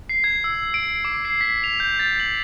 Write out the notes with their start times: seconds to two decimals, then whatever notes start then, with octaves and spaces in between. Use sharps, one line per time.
0.09 C7
0.24 G#6
0.44 E6
0.74 D7
1.04 D6
1.25 C7
1.41 B6
1.64 F7
1.80 G6
1.99 A6
2.20 F#7